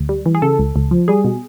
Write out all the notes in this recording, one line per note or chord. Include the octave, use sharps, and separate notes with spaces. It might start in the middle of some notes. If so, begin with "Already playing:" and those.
Already playing: D2
G3
E3
G#4
C#3 A4
C#2
C#2
F3
G3 G#4
B2